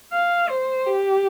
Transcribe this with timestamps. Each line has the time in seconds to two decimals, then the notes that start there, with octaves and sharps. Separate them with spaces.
0.13 F5
0.49 C5
0.86 G4